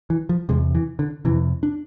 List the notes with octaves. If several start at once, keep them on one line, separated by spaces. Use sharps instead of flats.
E3
F3
E2 C3 G#3
E3
D3
F2 C3 E3
D4